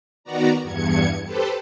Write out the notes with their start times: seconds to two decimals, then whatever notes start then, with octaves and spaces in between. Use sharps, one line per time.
0.24 D#3 B3 F#4 D5 A#5
0.62 E2 G2 G#6 C#7
1.25 G4 A4 B4 C5